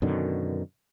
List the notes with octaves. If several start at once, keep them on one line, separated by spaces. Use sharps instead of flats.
F#2 B2 D3 D#3